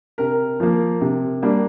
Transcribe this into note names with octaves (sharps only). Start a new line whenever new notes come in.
C3 A#4
F3 A#3
C3
G3 A#3 D4